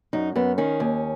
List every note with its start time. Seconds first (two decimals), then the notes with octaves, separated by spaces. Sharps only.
0.13 F#2 D#4
0.36 F#2 B3
0.58 D#3 C#4
0.80 D#2